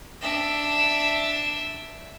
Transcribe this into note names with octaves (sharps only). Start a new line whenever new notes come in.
D4 E5